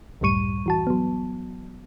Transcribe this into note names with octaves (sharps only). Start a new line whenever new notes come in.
C#2 F#2 A2 G3 C#6 D#7
E3 F#4 A5
F#3 B3